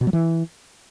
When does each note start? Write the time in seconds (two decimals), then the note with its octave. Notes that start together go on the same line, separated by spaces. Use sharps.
0.01 B2
0.07 F#3
0.13 E3